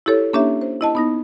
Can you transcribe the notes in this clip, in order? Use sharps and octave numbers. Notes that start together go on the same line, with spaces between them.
E4 G4 A4 C#5
A#3 C#4 D4 G4 C#5 E5
C5
E4 D#5 A5
B3 D#4 A#6